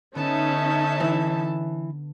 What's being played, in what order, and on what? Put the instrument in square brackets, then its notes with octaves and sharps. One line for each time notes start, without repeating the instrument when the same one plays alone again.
[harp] D3 B3 [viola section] C#4 D#4 E5 [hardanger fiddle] A4 A5
[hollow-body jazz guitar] E3 E4